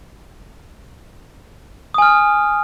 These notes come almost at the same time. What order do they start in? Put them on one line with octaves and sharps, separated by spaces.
D#6 G#5 F6